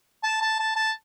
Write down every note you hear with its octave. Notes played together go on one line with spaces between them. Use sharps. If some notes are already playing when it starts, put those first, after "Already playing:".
A5
A5
A5
A5